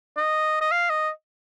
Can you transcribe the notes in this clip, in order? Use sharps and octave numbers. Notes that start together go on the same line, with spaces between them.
D#5
D#5
F5
D#5